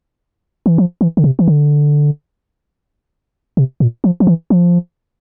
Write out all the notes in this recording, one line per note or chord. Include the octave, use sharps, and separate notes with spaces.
E3
F3
E3
D3
C3
E3
D3
C3
A#2
F3
F3
E3
F3